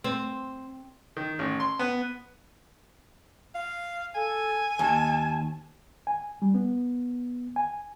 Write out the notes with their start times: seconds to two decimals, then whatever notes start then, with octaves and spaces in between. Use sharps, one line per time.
0.04 C4
1.17 D#3
1.39 A1
1.60 C6
1.79 B3
3.55 F5
4.15 A4 G#5
4.79 D#2 A5
6.07 G#5
6.42 G3
6.54 B3
7.56 G#5